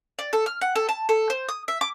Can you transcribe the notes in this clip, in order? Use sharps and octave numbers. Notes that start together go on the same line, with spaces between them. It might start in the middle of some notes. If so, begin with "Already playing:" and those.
D5
A4
F6
F#5
A4
A5
A4
C5
D#6
E5
D6